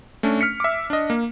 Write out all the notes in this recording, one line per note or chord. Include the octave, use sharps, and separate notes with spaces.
A3 C#4 D4
F6 B6 C#7
E5 D6
D4 D#5
A#3